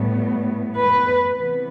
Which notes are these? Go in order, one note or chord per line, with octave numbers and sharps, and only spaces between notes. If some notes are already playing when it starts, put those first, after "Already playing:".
Already playing: A2 G3 B3
B4
C3 E3 B3